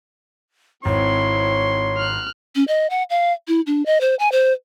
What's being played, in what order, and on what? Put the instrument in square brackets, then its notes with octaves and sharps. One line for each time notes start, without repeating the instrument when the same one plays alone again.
[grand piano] G#1 [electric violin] C4 E4 [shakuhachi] C#5 [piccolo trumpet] C6
[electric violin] F6 F#6
[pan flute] C#4
D#5
F#5
F5
E4
D4
D#5
C5
G#5
C5